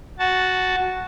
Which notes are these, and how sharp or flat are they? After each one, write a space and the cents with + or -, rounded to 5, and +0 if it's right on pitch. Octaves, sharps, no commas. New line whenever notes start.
F#4 +0 A5 +0